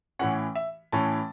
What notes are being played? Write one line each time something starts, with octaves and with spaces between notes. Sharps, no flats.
A2 E3 C#4 F#5
E5
A2 E3 C#4 A5